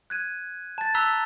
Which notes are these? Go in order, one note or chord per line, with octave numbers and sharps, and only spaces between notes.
F#6 G#6 D#7
A5 A6
A#5 E6 F#6 B6 G7